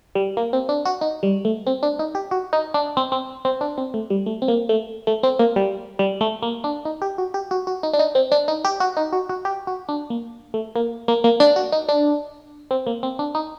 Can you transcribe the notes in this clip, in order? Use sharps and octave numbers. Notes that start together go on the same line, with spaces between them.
G3
A#3
C4
D4
F#4
D#4
G3
A3
C4
D4
D#4
G4
F#4
D#4
D4
C4
C4
C4
D4
C4
A3
G3
A3
C4
A#3
A3
A3
C4
A#3
G3
G3
A3
A#3
D4
D#4
G4
F#4
G4
F#4
F#4
D#4
D4
D#4
C4
D4
D#4
G4
F#4
D#4
F#4
F#4
G4
F#4
D4
A#3
A3
A#3
A#3
A#3
D4
F#4
D#4
D4
C4
A#3
C4
D4
D#4